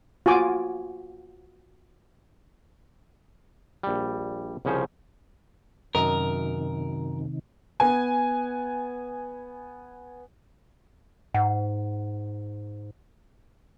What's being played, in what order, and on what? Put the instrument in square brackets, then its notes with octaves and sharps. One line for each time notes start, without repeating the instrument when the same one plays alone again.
[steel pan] F4 F#4 G#5 D6
[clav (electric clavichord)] A#1 G3
C2 C#3 F3 C#4 C5
[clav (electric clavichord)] F#2 D#5 [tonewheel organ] C3 D#3 [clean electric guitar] A#4
[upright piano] B3 G#5
[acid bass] G#2 [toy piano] F#5